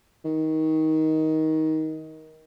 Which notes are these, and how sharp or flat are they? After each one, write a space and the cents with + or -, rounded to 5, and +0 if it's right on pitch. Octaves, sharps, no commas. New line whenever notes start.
D#3 +20